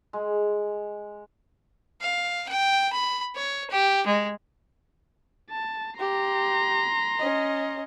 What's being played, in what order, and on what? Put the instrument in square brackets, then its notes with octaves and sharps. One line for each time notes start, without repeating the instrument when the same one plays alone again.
[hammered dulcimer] G#3
[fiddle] F5
G5
B5
C#5
G4
G#3
[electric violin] A5
[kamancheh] G4 [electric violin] A#5 C6
[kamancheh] C#4 D#5